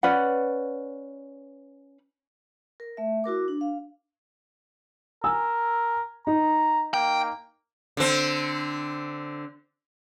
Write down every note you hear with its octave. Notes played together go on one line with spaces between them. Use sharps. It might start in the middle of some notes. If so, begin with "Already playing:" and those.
C#4 B4 D5 F#5
A#4
A3 E5
E4 F#4 A#4 D6
D4
F5
A#4 G#5 E6
D#4 A#5
A#3 G5
D3 C4